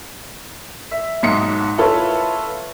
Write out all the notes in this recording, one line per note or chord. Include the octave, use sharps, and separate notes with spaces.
E5
B1 G#2 D#4 C#7
E4 F4 A4 B4 C#5